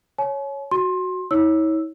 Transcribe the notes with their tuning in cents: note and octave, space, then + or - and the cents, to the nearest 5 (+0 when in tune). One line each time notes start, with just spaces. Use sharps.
C#5 +0 G#5 +45
F#4 +0 C6 +20
E4 -45 C#5 +0 E6 +0